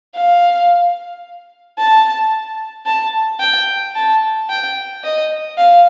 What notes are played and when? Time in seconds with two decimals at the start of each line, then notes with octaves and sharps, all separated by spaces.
0.15 F5
1.79 A5
2.86 A5
3.40 G5
3.96 A5
4.50 G5
5.04 D#5
5.58 F5